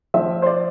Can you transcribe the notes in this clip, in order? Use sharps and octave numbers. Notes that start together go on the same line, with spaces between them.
F3 E5
C5
D5